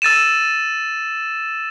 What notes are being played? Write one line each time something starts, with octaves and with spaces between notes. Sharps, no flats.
E6 A6 D#7 E7